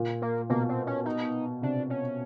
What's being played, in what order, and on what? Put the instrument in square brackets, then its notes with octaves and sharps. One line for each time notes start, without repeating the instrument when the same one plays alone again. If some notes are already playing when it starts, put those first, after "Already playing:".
Already playing: [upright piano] A#2
[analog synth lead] A#3
[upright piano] B2 [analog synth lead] A#3
[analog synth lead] C4
C#4
D#4
[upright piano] C3 [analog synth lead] D4
[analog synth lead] C#4